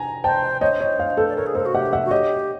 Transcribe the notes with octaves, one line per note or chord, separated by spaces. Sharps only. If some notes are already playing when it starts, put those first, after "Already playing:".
Already playing: G#5 A#5
C5 G5 A5
C5 C#5 D#5
C#5 D#5
D#5 F5
A4 B4
D5
A#4 C#5
G#4
A4 A#4 C5
F#4
G4 E5 F#5
E5 F#5
F#4
G4 C#5 D#5